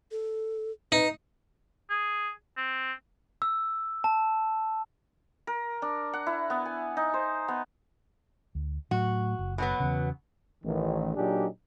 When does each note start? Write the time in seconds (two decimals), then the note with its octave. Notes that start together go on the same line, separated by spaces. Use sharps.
0.11 A4
0.92 D#4 B4
1.90 G#4
2.57 C4
3.42 E6
4.04 A5
5.47 A#4
5.82 D4
6.13 F#5
6.26 E4
6.50 B3
6.66 G#5
6.97 D#4
7.14 C5
7.48 B3
8.55 D2
8.91 A2 F#3 F#4
9.39 F#1
9.58 B2 F#3 B3
9.80 E2 C#3
10.64 A1 D#3
11.16 A#2 F#3 D4 D#4 G4 G#4